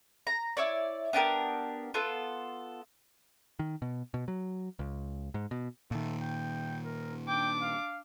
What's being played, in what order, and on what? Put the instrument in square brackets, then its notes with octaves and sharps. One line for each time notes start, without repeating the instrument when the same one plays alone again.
[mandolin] A#5
E4 C#5 D5
B3 D4 G4 A#4
B3 F4 A4
[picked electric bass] D#3
B2
B2
F#3
C#2
G#2
B2
[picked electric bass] A#2 D#3 [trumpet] A3
[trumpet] G5
A#4
[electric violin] D4 D6 [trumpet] G5
[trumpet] F5